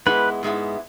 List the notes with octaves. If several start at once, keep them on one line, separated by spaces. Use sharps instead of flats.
G#2 G#3 B3 E4 B4
G#2 G#3 B3 E4